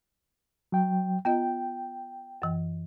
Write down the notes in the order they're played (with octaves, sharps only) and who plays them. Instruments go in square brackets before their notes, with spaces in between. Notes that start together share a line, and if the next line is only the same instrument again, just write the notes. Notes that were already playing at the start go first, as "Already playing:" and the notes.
[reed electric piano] F#3 G5
[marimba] B3 F4 D#5 [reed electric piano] G5
[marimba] F#2 E3